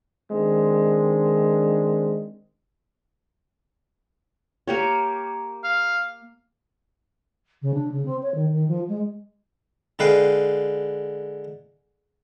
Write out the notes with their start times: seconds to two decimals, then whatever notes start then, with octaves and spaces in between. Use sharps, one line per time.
0.31 D#3 G#3 C4 D4
4.67 A#3 G4 C#5
5.64 F5
7.62 C#3
7.74 D4
7.92 C#3
8.05 C4
8.23 C#5
8.34 D#3
8.52 D#3
8.68 F3
8.88 G#3
9.99 D3 G#3 B4 F5 G5 D#6